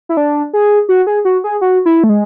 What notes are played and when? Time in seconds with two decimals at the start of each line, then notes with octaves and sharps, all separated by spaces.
0.09 E4
0.17 D4
0.53 G#4
0.89 F#4
1.07 G#4
1.25 F#4
1.44 G#4
1.61 F#4
1.86 E4
2.04 A3
2.09 G#3